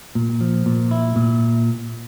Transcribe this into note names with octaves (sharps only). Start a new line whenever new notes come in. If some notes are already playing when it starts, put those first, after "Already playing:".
A#2
F3
A#2
E4
A#2